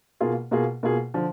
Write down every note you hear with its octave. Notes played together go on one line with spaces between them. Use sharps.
B2 A#3 F4 G#4
B2 A#3 F4 G#4
B2 A#3 F4 G#4
D3 F3